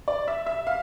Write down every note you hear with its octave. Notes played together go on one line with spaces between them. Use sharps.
D5
E5
E5
F5